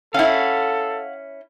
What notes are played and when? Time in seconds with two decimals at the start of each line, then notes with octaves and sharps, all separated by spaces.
0.14 C#4 E4 A4 F5 F#5